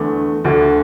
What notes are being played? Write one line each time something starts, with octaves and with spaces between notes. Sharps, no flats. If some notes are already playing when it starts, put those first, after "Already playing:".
Already playing: E2 D3 A3
D2 D3 A3